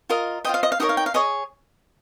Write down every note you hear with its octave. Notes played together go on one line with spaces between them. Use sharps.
F4 A#4 D#5
F4 C5 D#5 G5
F5
D#5
F5
D#4 G4 A#4 C#5 D#5
F5
G5
F5
G#4 C#5 D#5